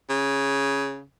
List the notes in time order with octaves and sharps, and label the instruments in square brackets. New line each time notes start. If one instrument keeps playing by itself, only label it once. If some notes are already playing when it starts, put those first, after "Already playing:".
[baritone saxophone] C#3